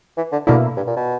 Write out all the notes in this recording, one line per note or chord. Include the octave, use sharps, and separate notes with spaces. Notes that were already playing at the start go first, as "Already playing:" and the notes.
E3
D3
B2 D3 A#3 E4
G2
A#2
B2